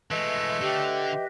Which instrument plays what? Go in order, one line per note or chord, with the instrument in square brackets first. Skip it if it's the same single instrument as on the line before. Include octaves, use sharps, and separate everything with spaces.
[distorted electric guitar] E3 G#3 [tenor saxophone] A3 [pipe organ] B4 D#5 E5
[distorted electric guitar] D3 [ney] G4